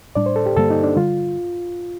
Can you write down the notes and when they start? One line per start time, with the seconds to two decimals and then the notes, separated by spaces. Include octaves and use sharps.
0.15 A2 G3 D4 D5
0.26 C5
0.36 A4
0.46 G4
0.56 G2 D3 G3 A#3 A4
0.70 D#4
0.83 D4
0.96 D3 G3 F4